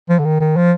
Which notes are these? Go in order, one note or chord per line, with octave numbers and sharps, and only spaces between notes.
F3
D3
D#3
D#3
F3